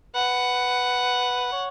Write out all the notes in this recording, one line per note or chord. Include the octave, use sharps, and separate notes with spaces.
B4 F#5
C#5